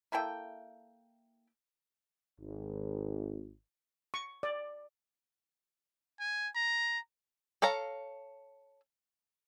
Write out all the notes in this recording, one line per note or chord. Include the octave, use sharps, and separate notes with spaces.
A#3 E4 A4 G5
G#1
C#6
D5
G#5
A#5
A4 C#5 F5 A#5